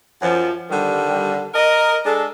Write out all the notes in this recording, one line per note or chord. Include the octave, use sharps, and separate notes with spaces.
F#2 F3
D3 D#3 G3
A#4 D#5
G#3 D4 A4